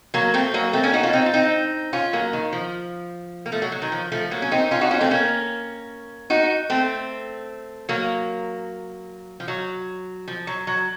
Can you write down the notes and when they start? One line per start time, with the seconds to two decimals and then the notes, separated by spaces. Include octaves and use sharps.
0.14 F#3 A#3
0.34 A3 C4
0.54 F#3 A#3
0.73 A3 C4
0.83 A#3 C#4
0.93 D#4 F#4
1.03 C#4 F4
1.13 C4 D#4
1.26 F4
1.33 C4 D#4
1.93 C#4 F4
2.13 F#3 A#3
2.33 D#3
2.53 F3
3.46 A#3
3.52 F3 A3
3.62 F#3
3.72 F#3
3.82 D#3
3.92 F3
4.12 F3 A3
4.31 F#3 A#3
4.42 C#4
4.51 C4 D#4
4.71 C#4 F4
4.81 D#4 F#4
4.91 C#4 F4
5.01 A3 C4
5.11 A#3 C#4
6.30 D#4 F#4
6.70 A3 C4
7.89 F#3 A#3
9.40 F3
9.48 F#3
10.28 F3
10.47 F#3
10.67 F#3